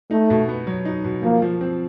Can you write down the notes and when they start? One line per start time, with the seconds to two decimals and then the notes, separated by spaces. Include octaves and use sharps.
0.11 A3 D#4
0.30 B2
0.49 B3
0.67 F#3
0.86 D#4
1.04 B2
1.23 F3 A#3
1.42 F3
1.61 C4